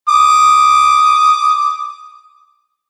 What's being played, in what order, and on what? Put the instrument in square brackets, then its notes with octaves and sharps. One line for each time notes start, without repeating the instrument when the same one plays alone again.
[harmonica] D6 D#6